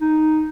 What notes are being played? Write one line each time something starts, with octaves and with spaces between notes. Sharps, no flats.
D#4